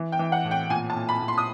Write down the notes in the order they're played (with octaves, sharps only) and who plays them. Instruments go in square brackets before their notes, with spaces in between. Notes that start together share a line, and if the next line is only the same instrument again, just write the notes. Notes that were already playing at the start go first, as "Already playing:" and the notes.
Already playing: [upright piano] E3
G5
E3
F#5
A2
G5
A#2 G#5
A5
A#2
B5
A#2
C6
D#6